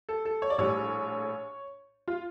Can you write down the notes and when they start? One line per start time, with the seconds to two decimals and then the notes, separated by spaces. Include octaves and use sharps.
0.09 A4
0.25 A4
0.42 C#5
0.50 D5
0.58 A#1 A2 G3 C#5
2.08 F4